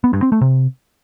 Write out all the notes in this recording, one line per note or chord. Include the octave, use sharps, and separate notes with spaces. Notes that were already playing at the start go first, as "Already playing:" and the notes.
B3
G2
C4
A3
C3